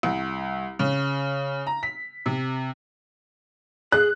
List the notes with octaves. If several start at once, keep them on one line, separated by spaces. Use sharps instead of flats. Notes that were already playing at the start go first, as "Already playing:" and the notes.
C2
C#3
A#5
B6
C3
G#4 F#6